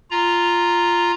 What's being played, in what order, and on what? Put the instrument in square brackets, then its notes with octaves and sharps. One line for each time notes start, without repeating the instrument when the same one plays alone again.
[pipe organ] F4 A#5